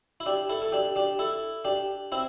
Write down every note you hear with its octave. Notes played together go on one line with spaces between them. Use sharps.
E4
D4 G4
E4 A4
A4
D4 G4
D4 G4
E4 A4
D4 G4
C4 E4